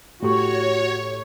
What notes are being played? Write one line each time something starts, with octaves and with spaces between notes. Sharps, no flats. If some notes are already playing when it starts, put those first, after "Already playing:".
A2 F#4 G4 C#5 C#6